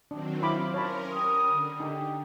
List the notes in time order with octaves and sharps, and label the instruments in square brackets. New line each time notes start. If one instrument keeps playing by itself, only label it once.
[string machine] D#3 F#3 C4 [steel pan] D4
[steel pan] E4 B5 D6 [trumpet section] F4 C5
[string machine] C#4 A#4 [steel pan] C#5 A5 B5
[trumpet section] G3 D#6
[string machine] D3
[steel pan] D#4 [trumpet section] G4